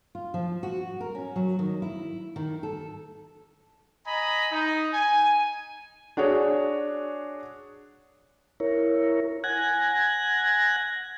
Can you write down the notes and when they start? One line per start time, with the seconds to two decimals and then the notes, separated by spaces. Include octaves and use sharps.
0.15 F4
0.34 F3
0.63 F#4
1.01 A#4
1.15 C#4
1.36 F#3
1.59 D#3
1.82 E4
2.36 D#3
2.63 A4
4.07 D#5 G#5 A#5 B5
4.51 D#4
4.93 G#5
6.17 D4 F#4 G#4 C#5
8.60 E4 A#4 C#5
9.44 F#5 G#5 F#6 G#6 A#6